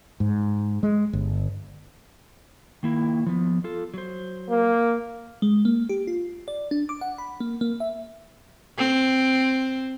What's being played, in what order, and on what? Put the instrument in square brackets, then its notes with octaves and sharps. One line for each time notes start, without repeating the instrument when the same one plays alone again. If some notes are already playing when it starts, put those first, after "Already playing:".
[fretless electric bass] G#2
G#3
G1
[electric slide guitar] D#3 A#3 E4
F3 B3
F4 A4
F#3 C5
[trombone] A#3
[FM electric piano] G#3
A#3
G4
F4
D5
D4
D6
F#5
B5
A#3
A#3
E5
[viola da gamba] C4